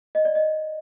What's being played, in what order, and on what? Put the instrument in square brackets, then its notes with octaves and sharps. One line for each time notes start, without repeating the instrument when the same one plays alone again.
[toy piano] D#5
D5
D#5